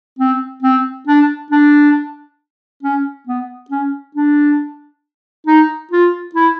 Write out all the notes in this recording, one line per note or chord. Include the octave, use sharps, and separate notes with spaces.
C4
C4
D4
D4
C#4
B3
C#4
D4
D#4
F4
E4